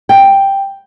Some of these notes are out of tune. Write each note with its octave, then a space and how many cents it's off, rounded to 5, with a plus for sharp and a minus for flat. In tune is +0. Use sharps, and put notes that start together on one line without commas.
G5 +5